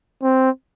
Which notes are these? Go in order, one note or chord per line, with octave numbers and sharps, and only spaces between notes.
C4